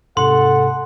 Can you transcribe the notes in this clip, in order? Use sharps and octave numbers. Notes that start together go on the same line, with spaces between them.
G#2 C3 A4 F#5 C6